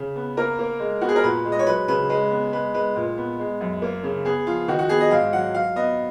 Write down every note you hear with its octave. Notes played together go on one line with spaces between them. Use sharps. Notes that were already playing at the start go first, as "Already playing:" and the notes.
Already playing: C#3
B3
A#3 A#4
A#3
G#3
B3 F#4
G#4
A#4
A#2 B4
G#3
D#5
C#5
F#3 B4
C#3 B4
G#3 B4
B3
G#3 B4
G#3 B4
A#2
B3
G#3
F#2
A#3
C#3
B3 G#4
F3 F4
D#3 F#4
F#4
B3 G#4
D#5
G#2 F5
F#3 F#5
F#3 F5
B3 D#5